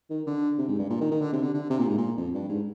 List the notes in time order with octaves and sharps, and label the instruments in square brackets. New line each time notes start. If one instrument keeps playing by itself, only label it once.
[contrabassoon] D#3
D3
C3
G#2
G2
A#2
D#3
D#3
D3
C3
D3
D3
C3
A#2
G#2
A#2
F2
G2
G#2